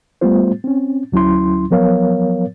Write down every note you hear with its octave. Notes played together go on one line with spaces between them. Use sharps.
G3 A3 B3 F4 C5
C4 C#4
D2 F#3 C#4 E4 C6
F3 F#3 B3 A#4 C#5 F5